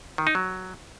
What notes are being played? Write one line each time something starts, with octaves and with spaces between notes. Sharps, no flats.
D#3
D#4
F#3